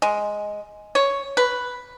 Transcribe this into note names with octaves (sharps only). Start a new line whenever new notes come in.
G#3
C#5
B4